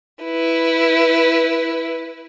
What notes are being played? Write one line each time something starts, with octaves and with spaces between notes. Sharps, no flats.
E4 B4